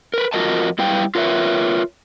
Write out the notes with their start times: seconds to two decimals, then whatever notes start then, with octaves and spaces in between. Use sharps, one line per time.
0.14 A#4 B4
0.33 F2 F4 F#4 A#4 D#5 A5
0.78 F#2 G3 E4 B4 F5 G5
1.15 F4 A#4 B4 C#5 E5